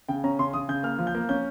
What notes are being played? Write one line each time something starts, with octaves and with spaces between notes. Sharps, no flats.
C#3 G5
C#4 A#5
C#3 C6
C#3 D#6
C#3 G6
A#3 F6
F3
G6
A#3
C#4 G6